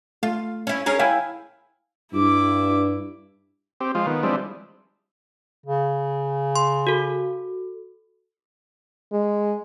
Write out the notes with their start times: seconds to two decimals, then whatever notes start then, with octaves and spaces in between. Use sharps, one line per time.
0.23 A3 F4
0.67 C#4 E4
0.86 C#4 G#4 A#4
0.99 E4 F5 G5 G#5
2.13 G2 E4 D6
3.80 C4 G4
3.95 F3 G#3 F4
4.06 D#3 B3
4.23 F3 G3 G#3 C4 D4 E4
5.66 C#3
6.56 C6
6.87 F#4 A4
9.12 G#3